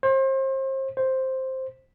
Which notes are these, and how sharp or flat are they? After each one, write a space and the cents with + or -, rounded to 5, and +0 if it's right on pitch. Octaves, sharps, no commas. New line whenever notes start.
C5 +35
C5 +5